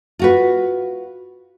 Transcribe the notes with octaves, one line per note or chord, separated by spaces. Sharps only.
F4 F#4 B4